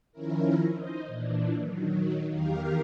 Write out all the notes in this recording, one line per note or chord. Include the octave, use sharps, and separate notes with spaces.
D#3 F3 C#4 E4 A#4
D#4 C5 D#5
A#2 E3 D4
D#3 F#3
E2 D#3 G4 A#4 F5